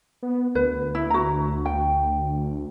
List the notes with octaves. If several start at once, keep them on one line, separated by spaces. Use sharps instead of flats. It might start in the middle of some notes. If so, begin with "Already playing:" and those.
B3
D2 B4
E4
F#4 A#5
G5